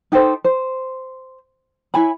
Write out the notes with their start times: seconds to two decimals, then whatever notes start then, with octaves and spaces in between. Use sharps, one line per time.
0.12 D#4 G4 A4 C5
0.44 C5
1.94 E4 C#5 G#5 B5